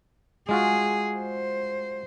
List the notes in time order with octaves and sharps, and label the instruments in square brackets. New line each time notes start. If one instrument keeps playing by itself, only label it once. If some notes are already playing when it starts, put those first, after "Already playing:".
[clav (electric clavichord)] G#3 F4 F#4 [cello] G#4
[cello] C5